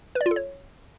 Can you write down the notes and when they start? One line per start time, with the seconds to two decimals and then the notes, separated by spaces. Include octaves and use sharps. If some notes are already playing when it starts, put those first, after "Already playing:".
0.15 B4
0.21 D5
0.26 F4
0.31 A4
0.36 C#5